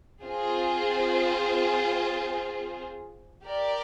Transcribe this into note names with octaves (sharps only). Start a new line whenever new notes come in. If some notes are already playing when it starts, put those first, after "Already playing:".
C4 F4 G#4 C5
G4 A#4 D5